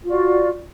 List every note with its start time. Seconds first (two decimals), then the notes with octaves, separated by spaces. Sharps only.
0.03 F4
0.07 F#4
0.10 D5